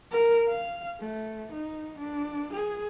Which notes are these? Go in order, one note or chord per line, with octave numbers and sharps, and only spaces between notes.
A#4
F5
A3
D#4
D4
G#4